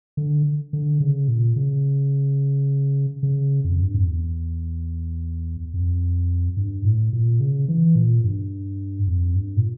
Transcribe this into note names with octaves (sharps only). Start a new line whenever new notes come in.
D3
D3
C#3
A#2
C#3
C#3
F2
G2
F2
E2
F2
G2
A2
A#2
C#3
E3
A#2
G2
F2
G2
A#2